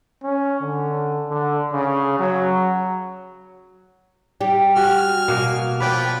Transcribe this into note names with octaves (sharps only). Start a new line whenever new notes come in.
C#4
D3
D3
C#3
F#3
G3 G4
F#4 G#5 F6
B2 A#3 D#5
F3 B4 D5 G5